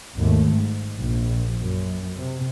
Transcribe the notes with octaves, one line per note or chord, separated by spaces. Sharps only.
G#1 D#2 A3
G#2
A#1
F#2
C3